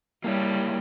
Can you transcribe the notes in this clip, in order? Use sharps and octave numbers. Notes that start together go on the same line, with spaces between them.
G3 A#3 E4 C#5